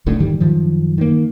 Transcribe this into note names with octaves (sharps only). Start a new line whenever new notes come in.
F1 C2 A2 D3
G#2 D3 D#3 G3
F#2 D#3 F3
D#3 A#3